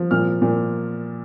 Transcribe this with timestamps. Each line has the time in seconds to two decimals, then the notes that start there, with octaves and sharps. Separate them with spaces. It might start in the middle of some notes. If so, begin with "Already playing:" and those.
Already playing: F3
0.11 A#2 F6
0.42 A#2